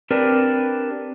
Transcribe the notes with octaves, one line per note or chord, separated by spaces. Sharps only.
C4 D4 G4 A#4 B4